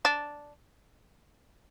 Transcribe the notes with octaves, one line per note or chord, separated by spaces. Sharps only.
D4